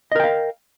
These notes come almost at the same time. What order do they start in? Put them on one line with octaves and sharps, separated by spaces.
D#5 A#4 G5 F5